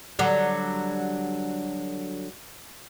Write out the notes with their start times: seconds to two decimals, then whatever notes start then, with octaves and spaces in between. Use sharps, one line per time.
0.19 D3 F#3 G3